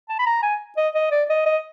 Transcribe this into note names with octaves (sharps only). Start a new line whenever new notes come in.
A5
B5
A#5
G#5
D#5
D#5
D5
D#5
D#5